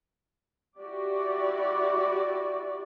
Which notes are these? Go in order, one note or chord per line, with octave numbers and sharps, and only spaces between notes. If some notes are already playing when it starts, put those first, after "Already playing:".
E4 F#4 G4 D5